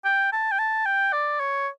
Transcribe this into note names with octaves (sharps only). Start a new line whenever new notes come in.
G5
A5
G5
A5
G5
D5
C#5